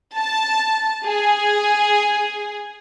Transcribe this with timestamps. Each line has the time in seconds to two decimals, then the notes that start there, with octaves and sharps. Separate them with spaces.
0.18 A5
1.06 G#4